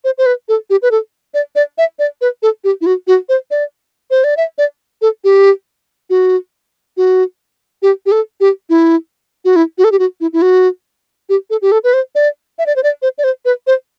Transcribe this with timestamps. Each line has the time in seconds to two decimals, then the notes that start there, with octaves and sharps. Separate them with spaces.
0.04 C5
0.18 C5
0.26 B4
0.49 A4
0.70 G4
0.82 B4
0.91 A4
1.34 D5
1.56 D5
1.78 E5
1.99 D5
2.21 B4
2.42 A4
2.64 G4
2.81 E4
2.86 F#4
3.07 F#4
3.29 C5
3.51 D5
4.11 C5
4.24 D5
4.37 E5
4.58 D5
5.02 A4
5.24 G4
6.10 F#4
6.97 F#4
7.82 G4
8.06 G4
8.12 A4
8.40 G4
8.70 E4
9.45 F#4
9.56 E4
9.78 F#4
9.84 A4
9.92 G4
9.99 F#4
10.21 E4
10.33 E4
10.42 F#4
11.29 G4
11.50 A4
11.62 G4
11.72 A4
11.84 B4
11.93 C5
12.15 D5
12.59 E5
12.66 D5
12.76 C5
12.83 D5
13.02 C5
13.18 D5
13.24 C5
13.45 B4
13.67 C5